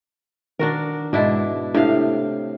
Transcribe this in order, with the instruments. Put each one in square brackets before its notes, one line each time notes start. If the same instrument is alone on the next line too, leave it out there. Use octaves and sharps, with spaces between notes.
[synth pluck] D#3 [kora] D4 F#4 A#4
[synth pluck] G#2 G#3 [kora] B2 D4 E4
[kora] A2 C3 F5 [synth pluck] D4